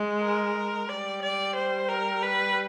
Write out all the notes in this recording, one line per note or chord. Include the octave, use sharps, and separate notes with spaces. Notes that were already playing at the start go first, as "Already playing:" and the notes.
Already playing: G#3
A#4
G3 D5
D5
C5
A#4
B4